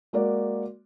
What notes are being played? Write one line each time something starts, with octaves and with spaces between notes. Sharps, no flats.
G#3 A#3 F#4 A#4 D5